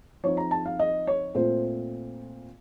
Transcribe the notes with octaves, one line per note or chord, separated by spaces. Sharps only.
F3 C4 D#4 C#5
A#5
A5
F5
D#5
C#5
A#2 A3 C4 F4 C5